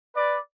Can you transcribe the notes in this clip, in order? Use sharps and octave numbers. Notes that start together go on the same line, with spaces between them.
B4 D5